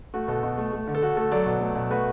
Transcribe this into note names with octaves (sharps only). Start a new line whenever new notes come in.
A3 F#4
B2 A4
B2
A3
A3
D3
A4
D3 F#4
A3 A4
F#3 A4 D5
B2
A3
B2
A3 F#4 B4